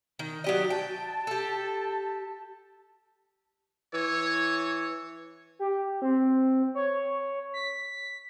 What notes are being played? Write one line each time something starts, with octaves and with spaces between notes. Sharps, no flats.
D#3
F#3 G4 D5 D#5
G5 A5
G4 A4
E3 C#5
G4
C4
C#5
B6